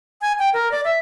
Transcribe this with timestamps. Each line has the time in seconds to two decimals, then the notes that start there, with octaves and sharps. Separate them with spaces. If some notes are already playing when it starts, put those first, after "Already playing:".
0.22 G#5
0.39 G5
0.53 A#4
0.71 D5
0.85 E5